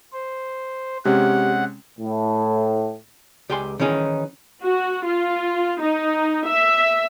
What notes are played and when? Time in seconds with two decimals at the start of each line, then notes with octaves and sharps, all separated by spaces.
0.13 C5
1.05 C3 G#3 C#4 G4 F#5
1.99 A2
3.50 C#2 G4 D5 G5 G#5 C6
3.80 D#3 E3 C#4 D#4 G#4
4.63 F#4
5.06 F4
5.81 D#4
6.48 E5